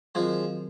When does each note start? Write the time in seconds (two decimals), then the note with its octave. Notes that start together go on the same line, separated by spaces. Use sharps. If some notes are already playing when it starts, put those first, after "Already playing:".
0.15 D#3 F3 F#3 G#3 C4 F#4 A#4